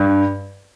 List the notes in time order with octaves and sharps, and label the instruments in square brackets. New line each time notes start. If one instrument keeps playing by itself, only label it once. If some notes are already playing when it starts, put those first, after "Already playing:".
Already playing: [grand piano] G2